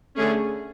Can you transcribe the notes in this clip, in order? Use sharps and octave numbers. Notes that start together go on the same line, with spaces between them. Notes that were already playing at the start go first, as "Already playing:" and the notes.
D3 A3 C#4 G#4